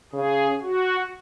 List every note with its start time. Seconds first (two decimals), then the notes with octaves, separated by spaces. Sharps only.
0.13 C#3 G#4
0.62 F#4